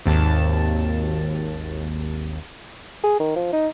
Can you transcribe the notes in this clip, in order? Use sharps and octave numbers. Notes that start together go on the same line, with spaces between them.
G#1 D#2 A5
G#4
D#3
F3
D#4